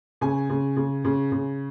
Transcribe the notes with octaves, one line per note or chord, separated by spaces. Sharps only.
C#3 G#5
C#3
C#3
C#3
C#3